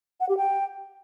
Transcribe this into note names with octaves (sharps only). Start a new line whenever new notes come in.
F#5
G4
G5